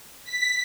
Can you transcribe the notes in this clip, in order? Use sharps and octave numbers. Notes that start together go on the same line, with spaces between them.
B6